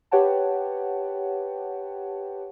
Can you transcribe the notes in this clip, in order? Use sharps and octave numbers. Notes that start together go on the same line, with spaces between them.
G4 B4 C#5 F#5 G5 A5